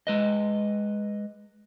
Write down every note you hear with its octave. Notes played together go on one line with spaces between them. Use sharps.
G#3 B4 D#5